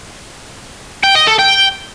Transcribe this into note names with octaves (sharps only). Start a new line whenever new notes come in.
G5
D#5
A4
G5